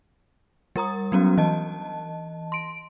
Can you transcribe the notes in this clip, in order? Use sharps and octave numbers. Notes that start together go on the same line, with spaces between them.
G3 A#4 A#5 D#6
F#3 B3 C#4 F#4
E3 D#5 A5
C6 D7